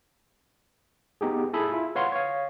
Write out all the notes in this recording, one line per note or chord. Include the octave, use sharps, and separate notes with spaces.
B3 D#4 G4 G#4
E4 G#4 A4 G#5 B5
E4 F4
B4 C#5 F5 F#5 C6
C#5 F5